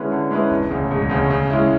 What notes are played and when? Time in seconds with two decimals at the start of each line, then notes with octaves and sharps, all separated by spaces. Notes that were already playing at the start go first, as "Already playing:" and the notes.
Already playing: D3 G#3 C#4 E4 B4
0.12 D3
0.31 G#3 C#4 E4 B4
0.50 E1
0.70 D2 C#3
0.91 E1
1.10 D2 C#3
1.30 C#3
1.50 G#3 C#4 E4